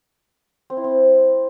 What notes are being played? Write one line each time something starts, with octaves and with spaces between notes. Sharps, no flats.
C4
E4
C4